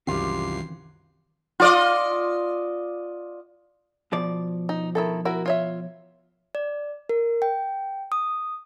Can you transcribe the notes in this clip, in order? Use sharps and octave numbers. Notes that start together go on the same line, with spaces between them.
C2 F#2 D#3 E3 C4 F4 G4 C7
F4 D5 D#5
B2 F3 D5
D#4
D#3 E4 A4
E4 F#4 A#4
F4 C#5 E5
D5
A#4
G5
D#6